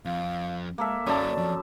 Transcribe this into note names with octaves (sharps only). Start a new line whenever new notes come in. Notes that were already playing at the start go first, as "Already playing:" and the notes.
F2 F5
G#3 A#3 A4 E5
F#2 A#3 C#4 D5 A5
F2